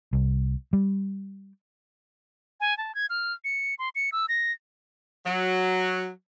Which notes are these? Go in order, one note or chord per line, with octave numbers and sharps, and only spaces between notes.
C2
G3
G#5
A5
G#6
F6
C#7
C6
C#7
E6
A#6
F#3